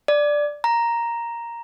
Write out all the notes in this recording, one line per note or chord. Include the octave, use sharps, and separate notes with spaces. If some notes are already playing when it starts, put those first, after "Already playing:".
D5
A#5